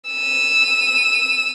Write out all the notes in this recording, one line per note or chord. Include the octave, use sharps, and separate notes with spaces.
E6 D#7